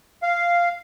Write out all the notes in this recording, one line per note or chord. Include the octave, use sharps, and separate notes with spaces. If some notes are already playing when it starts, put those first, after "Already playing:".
F5